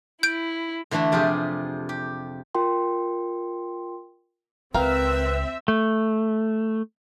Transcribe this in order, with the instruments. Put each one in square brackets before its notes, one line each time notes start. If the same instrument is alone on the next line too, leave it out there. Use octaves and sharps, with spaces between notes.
[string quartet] E4 [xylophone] G6 D7
[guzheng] D3 E3 A3 D4 E4
F2 C3 F4 G4 G#4
G4
[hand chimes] F4 A#4 G5 C6
[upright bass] C#2 [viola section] C4 E5 [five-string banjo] A#4 F5 G5 [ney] B4
[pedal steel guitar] A3